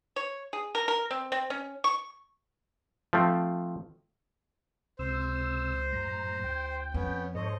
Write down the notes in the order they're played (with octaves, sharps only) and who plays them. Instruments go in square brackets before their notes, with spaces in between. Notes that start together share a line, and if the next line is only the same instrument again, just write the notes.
[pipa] C#5
G#4
A#4
A#4
C4
C4
C#4
C#6
[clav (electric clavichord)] F3 A3 C4
[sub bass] C#2 [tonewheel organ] C3 E6 [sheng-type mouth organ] C5
[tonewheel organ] F#2 A2 A#5
[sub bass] D2 [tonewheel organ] G5
[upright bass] F2 [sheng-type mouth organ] B3 C#4
[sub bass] G#2 [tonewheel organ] A4 C5 C#5 [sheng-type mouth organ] D#5